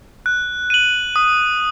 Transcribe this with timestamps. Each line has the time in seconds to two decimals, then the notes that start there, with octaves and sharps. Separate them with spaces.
0.26 F#6
0.70 D#7 F#7
1.16 D#6